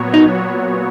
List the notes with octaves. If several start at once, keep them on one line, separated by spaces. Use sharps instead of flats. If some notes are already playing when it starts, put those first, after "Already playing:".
Already playing: A#2 F#3 B3 F#4 C#5
D#4